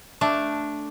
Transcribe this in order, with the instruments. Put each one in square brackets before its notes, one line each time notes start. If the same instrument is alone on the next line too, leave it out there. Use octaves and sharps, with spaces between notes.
[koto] A3 D4 D5